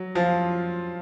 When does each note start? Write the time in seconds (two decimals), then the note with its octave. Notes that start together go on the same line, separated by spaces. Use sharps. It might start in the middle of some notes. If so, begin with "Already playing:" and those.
Already playing: F#3
0.15 F3 F4